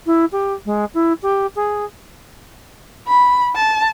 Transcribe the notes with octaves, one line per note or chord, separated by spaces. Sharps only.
E4
G4
G#3
E4
G4
G#4
B5
A5